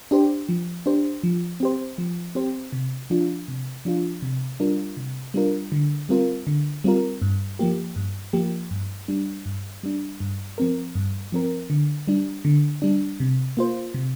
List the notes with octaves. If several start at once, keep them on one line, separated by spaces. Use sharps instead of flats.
D4 G4 C5
F3
D4 G4 C5
F3
C4 G4 C5
F3
C4 G4 C5
C3
F3 D4 F4
C3
F3 D4 F4
C3
G3 D4 F4 A#4
C3
G3 D4 F4 A#4
D3
G3 C4 F4 A#4
D3
G3 C4 F4 A#4
G2
F3 A#3 G4
G2
F3 A#3 G4
G2
G3 D4
G2
G3 D4
G2
F3 C4 A#4
G2
F3 C4 A#4
D3
G3 D4
D3
G3 D4
C3
A#3 F4 C5
C3